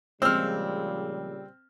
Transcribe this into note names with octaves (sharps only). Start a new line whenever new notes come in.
A#2 C#3 F3 G3 G#3 C4 E6 F6